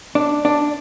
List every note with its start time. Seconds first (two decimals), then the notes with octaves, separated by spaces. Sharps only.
0.15 D4
0.45 D4